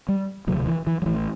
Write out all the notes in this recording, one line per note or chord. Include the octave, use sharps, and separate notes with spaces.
G3
E1 D2 C3 F#3
E3
E3
F#3
A1 A2 E3